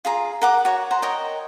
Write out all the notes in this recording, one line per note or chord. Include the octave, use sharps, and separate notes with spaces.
F4 G#4 A#5
A#4 F#5 D6
F#4 C#5
C5 F#5 A#5
A#4 C#5 D#5 G5